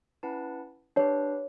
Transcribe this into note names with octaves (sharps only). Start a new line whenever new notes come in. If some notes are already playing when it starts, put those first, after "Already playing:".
C#4 E4 B4 F#5 A5
D4 G4 B4 C#5